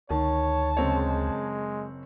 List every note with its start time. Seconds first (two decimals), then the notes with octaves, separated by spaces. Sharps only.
0.10 D2 D#3 C#5 A5
0.77 F#1 G#3 C4 C#5